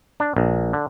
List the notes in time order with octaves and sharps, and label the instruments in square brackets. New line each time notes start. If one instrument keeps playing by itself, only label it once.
[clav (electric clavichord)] D4
A#1
D3